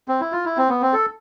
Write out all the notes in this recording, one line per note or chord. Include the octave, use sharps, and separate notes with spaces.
C4
E4
F4
E4
C4
B3
C4
A4